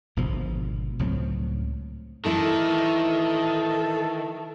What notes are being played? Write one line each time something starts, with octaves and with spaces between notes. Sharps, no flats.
G#1 B2 D3 F3
C#2 A2 F#3 C4
D#3 E3 A3 E4 A4